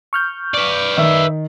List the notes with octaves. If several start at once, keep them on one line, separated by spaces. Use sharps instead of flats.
C#6 F6 G6
B4 D5
D#3 E5